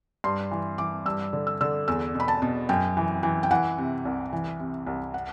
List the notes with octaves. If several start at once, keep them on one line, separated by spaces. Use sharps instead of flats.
G2 C6
E3
E3 D6
G2 E6
D3
E6
D3 E6
E2 E6
B2
B5
A5
B2
F#2 G5
E3
E3
G5
E3 F#5
C3
C2
E3
C3
C2
F#5